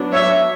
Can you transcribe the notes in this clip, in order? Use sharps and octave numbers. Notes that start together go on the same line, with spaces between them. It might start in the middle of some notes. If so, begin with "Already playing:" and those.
Already playing: F#3 B3 D4
C#5 E5